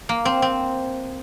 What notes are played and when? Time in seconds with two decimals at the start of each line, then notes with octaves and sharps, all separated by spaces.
0.09 A#3
0.25 C4
0.42 C4